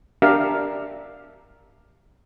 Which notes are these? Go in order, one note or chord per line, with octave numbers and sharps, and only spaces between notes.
D4 G4 A#4 E5 F5